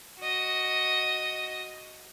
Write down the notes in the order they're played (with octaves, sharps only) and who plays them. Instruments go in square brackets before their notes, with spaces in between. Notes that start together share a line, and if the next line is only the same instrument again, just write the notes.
[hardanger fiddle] F#4 D#5